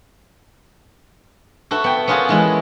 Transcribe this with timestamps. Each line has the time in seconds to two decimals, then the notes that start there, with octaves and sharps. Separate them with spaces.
1.71 F#4 A4 B4 E5
1.84 B3 G5
2.08 B3 C#4 F4 F#4 G#4 A#4
2.29 E3 G#3 E4